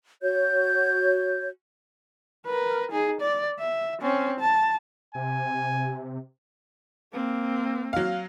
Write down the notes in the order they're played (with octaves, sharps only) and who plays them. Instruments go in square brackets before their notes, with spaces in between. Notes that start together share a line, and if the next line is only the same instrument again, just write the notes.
[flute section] F#4 C#5 G6
[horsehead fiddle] A#4 B4
D#4 G#4
D5
E5
C4 C#4
A5
[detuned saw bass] C3 [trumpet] G#5
[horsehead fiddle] A#3 C4
[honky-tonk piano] F#3 F5